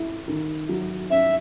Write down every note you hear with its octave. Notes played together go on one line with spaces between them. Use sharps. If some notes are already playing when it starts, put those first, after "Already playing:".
Already playing: E4
D#3
F#3
C#4 E5